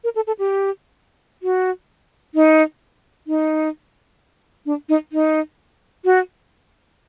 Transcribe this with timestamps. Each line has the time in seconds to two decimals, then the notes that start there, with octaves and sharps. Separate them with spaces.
0.04 A#4
0.16 A4
0.27 A4
0.39 G4
1.43 F#4
2.35 D#4
3.27 D#4
4.66 D4
4.89 D#4
5.12 D#4
6.05 F#4